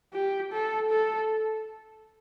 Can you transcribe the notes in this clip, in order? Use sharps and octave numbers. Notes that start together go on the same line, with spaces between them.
G4
A4
A4